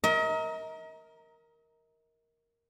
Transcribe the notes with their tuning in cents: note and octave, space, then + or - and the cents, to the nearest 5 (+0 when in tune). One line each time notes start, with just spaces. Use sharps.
A#4 +0 D#5 +40